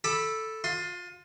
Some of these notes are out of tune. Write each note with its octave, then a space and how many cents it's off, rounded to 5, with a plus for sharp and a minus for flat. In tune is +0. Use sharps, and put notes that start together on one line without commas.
A4 +0 B5 -5 D6 +30
F4 +30 C6 +0